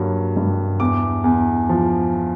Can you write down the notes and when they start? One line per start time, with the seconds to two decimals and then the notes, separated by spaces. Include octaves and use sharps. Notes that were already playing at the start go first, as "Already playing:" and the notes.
Already playing: G2 F#3 A#3
0.37 G2
0.80 E2 D6
1.24 E2
1.69 F3